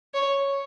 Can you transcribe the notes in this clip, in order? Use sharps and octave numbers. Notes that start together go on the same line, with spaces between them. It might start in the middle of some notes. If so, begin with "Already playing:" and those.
C#5